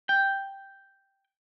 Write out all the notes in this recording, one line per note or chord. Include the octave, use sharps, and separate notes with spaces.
G5